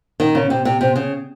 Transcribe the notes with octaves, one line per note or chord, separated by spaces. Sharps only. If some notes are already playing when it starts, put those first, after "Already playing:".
D#3
C#3
C3
C3
C3
C#3